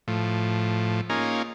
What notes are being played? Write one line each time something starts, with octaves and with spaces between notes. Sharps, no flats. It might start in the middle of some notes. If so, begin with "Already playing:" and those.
A2 F3
A#3 C#4 D#4 F4 G#4